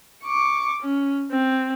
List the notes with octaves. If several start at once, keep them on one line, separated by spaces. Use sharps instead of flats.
C#6 D6
C#4
C4